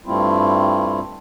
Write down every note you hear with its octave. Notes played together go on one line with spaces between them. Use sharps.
G2 G3 A3 C4 E4 F4